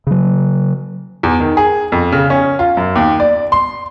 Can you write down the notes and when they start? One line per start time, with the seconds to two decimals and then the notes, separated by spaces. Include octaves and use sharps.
0.07 C#3 F#3
1.23 E2
1.40 D#3
1.57 G#4
1.92 F2
2.12 C#3
2.30 C#4
2.59 F4
2.77 F#2
2.96 D#2
3.20 D5
3.52 C6